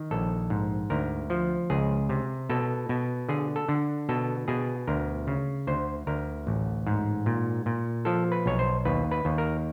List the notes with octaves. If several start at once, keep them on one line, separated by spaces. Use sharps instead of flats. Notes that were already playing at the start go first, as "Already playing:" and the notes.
Already playing: D#3
A#1 A4
G#2
D2 A#4
F3
C#2 G#4
C3
B2 A4
B2
D3 G#4
A4
D3
B2 A4
B2 G#4
D2 A#4
C#3
D2 C5
D2 A#4
A1
G#2
A#2
A#2
F3 A4
B4
B1 C#5
C5
D#2 B4
B4
D#2
A#4